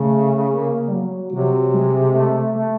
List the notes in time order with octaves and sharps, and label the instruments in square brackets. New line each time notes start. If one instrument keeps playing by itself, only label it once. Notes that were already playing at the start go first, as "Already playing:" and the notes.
Already playing: [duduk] C#3 [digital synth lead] A3
[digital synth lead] A#3
G3
F#3
[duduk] C3 [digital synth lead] F#3
[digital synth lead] G#3
A3
A3